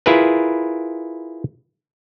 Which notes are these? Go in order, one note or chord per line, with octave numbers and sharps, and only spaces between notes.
E4 F4 G#4 A#4 B4